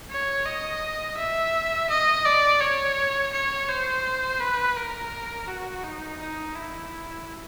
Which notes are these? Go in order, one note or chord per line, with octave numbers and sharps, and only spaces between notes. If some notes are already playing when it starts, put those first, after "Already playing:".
C#5
D#5
E5
D#5
D5
C#5
C#5
C5
B4
A#4
F#4
D#4
D#4
E4